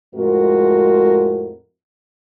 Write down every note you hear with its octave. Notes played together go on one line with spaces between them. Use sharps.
F2 A2 G#3 C4 F#4 A#4